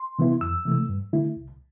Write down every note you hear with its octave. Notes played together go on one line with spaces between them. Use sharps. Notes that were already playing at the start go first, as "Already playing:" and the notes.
Already playing: C6
C3 E3 B3 E4
F2 E6
C3 E3 A3
G2
D3 A3 E4
C2